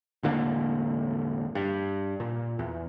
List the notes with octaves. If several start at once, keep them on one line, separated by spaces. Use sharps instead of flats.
E1 A2 D3 A#3
G2
A#2
E2